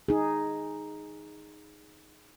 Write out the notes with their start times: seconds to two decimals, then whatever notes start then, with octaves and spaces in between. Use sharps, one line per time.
0.08 D#4 G#4